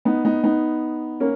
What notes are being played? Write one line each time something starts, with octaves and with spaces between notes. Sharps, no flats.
B3 D#4
B3 D#4
B3 D#4
A#3 C#4